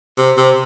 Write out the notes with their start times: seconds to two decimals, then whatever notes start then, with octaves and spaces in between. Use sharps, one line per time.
0.18 C3
0.37 C3